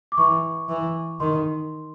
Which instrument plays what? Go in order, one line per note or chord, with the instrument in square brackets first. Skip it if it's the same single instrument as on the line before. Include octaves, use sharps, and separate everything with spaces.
[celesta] D6
[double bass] E3 [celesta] C#6
[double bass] E3
[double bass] D#3 [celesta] C6